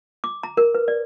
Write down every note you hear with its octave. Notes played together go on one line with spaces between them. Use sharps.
D6
A#5
A#4
B4
D5